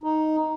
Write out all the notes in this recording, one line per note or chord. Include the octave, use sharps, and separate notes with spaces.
D#4